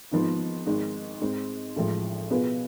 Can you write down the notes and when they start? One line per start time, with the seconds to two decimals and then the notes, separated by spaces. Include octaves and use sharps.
0.11 G#1 G#2 F3 B3
0.66 G#1 G#2 G#3
1.21 G#2 G#3 C4
1.76 A1 A2 F3 G#3
2.31 B2 B3 F4 G#4 B4